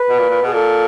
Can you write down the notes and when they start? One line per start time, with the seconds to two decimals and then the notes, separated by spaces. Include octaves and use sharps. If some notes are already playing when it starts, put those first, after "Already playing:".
Already playing: B4
0.09 B2
0.19 A#2
0.29 A#2
0.42 B2
0.47 G#4
0.53 A#2 A4